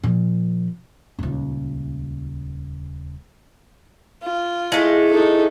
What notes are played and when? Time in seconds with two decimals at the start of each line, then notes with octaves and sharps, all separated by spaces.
0.04 A#2 F3
1.19 D#1 C#2
4.23 F4
4.72 G#3 A3 E4
5.10 D#4 A4